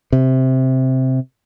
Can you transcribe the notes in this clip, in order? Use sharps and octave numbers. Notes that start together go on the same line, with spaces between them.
C3